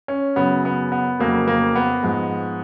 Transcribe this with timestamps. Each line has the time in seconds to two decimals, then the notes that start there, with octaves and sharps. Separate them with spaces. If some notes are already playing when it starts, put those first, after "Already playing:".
0.08 C#4
0.36 F#2 C#3 F#3 B3
0.65 B3
0.92 B3
1.19 F2 C#3 F#3 A#3
1.48 A#3
1.75 B3
2.03 G#2 F3 G#3